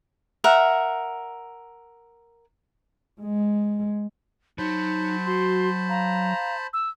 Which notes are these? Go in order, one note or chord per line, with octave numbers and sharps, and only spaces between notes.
A#4 E5 F#5
G#3
F#3 D#4 C5 A5 B5
F#4 C6
F5 A#5
E6